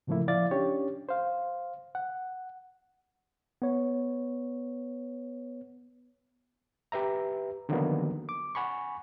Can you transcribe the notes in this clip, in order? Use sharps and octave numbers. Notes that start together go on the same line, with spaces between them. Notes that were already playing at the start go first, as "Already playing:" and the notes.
A2 C#3 F3 A3 A#3 E4
F3 E4 D5 F5 A6
C#4 D4 G4 C#5
C5 F5
F#5
B3 C#5
G4 B4 E5 A#5
D3 D#3 F3 F#3 A#3 B3
D6
F#5 G#5 B5 C#6